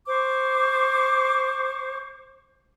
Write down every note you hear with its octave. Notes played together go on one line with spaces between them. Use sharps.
C5 C#6 D6